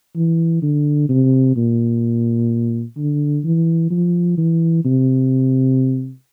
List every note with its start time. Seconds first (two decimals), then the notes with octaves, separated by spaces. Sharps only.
0.16 E3
0.62 D3
1.09 C3
1.56 A#2
2.97 D3
3.44 E3
3.90 F3
4.37 E3
4.85 C3